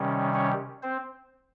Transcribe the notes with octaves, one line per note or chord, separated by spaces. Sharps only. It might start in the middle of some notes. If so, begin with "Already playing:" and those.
Already playing: C3 D#3 G3 C#4
C#4 C#5
C4 C5